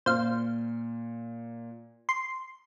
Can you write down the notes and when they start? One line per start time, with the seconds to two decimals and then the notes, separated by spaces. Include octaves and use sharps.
0.06 A#2 C5 F5
2.09 C6